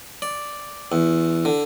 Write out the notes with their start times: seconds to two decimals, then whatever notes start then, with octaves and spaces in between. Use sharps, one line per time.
0.22 D5
0.92 E2
1.45 D3